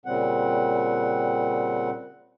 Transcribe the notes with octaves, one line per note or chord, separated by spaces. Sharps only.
A#2 C#3 G3 C4 F#5